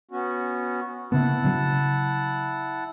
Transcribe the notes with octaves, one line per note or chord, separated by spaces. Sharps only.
B3 C#4 F#4
C#3 A#3 B3 E4 F#5 A5
C#3 F#3